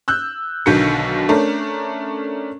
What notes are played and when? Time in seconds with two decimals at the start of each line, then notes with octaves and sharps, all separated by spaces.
0.08 E6 F#6 G6
0.66 B1 B2 D3 D#3 G6 C#7
1.29 A3 C#4 D4 A#4